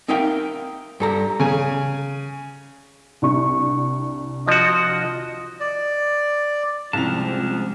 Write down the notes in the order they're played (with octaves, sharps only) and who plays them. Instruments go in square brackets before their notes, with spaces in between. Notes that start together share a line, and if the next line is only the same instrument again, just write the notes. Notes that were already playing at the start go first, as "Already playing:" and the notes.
[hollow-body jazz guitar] C4 D#4 A#4 E5 F5 G5
G2 A4 A#5
[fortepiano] C#3 G#5
[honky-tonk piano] C2 D4 C#6
[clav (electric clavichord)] F3 F#4 [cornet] D#5
[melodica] D5
[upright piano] C2 F7 [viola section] F3 G#3 [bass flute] C4 [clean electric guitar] C#4 A5